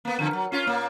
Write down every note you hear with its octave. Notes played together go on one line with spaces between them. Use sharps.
A#3 B3
F2 D3
F#3
C#4 F4
A#2 A#3